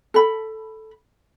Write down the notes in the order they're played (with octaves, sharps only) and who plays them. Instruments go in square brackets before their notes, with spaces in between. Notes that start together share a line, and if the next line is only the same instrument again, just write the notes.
[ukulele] A4 B5